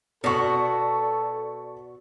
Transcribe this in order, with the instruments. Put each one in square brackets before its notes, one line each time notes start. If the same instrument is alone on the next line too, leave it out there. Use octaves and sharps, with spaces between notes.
[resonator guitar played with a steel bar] B2 F#4 [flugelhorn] A4 [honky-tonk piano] D5 C#6